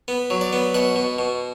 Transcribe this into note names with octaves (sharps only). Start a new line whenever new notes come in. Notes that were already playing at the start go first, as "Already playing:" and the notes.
B3
F#3
D5
B3
B2 F#5
B2
B2